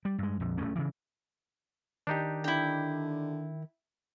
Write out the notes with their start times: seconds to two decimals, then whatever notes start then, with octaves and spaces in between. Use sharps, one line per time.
0.05 G3
0.18 G2 G#3
0.40 A#1 F2
0.57 D1 D2 A3 C#4
0.75 C#3 E3
2.07 D#3 D4 D#4 G4
2.44 D3 E4 G5